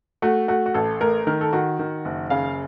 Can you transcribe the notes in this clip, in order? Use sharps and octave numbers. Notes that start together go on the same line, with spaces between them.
A3 F#4
A3 F#4
F#4
A1 A4
A3 A#4
D#3 A#4
A4
D#3 F#4
D#3
F#1
C#3 F5